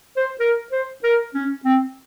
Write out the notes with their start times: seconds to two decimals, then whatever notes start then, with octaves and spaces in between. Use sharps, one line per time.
0.17 C5
0.40 A#4
0.72 C5
1.03 A#4
1.35 C#4
1.65 C4